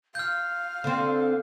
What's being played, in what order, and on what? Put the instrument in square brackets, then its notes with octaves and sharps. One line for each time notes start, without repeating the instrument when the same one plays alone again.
[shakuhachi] F5 [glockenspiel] F6 G6
[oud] D3 C4